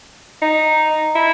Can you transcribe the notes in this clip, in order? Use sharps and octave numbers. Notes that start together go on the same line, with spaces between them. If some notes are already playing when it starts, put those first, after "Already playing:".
D#4
E4